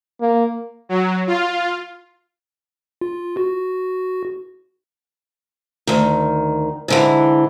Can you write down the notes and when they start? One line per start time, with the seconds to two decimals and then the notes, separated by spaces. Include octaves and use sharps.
0.21 A#3
0.89 F#3
1.27 F4
3.01 F4
3.37 F#4
5.87 D2 D#3
6.88 G#2 D3 E3